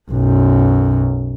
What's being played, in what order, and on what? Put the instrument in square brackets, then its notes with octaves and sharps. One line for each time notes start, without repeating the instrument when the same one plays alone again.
[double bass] B1 F#2